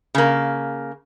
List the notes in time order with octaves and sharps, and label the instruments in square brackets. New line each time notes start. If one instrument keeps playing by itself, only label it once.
[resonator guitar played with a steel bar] C#3 A#3